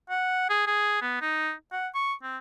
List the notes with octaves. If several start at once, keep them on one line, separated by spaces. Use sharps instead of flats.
F#5
G#4
G#4
B3
D#4
F#5
C#6
C4